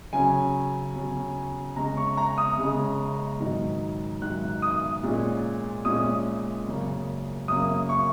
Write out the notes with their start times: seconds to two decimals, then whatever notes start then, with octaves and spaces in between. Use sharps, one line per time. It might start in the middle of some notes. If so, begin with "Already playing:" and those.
0.13 C#3 F#3 C#4 G#5
0.95 C#3 F#3 C#4
1.76 C#3 G#3 C#4 A#5
1.97 C#6
2.17 A#5
2.38 D#6
2.58 C#3 G#3 C#4
3.40 G#2 D#3 F#3
4.22 G#2 D#3 F#3 F#6
4.62 D#6
5.03 A#2 G#3 C#4
5.85 A#2 G#3 C#4 D#6
6.67 F#2 C#3 A#3 C#4
7.48 F#2 C#3 A#3 C#4 D#6
7.89 C#6